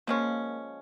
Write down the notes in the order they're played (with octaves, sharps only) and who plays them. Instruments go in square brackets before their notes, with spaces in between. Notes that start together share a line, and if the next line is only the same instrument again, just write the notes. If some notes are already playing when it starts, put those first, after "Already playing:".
[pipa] F3 G#3 C#4 [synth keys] A#3